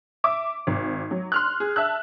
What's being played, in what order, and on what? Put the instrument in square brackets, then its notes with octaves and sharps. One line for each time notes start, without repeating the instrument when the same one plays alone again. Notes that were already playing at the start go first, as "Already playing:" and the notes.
[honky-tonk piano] E5 D6
G#1
F#3
C6 F6 F#6
G#4
E5 A5 E6 F#6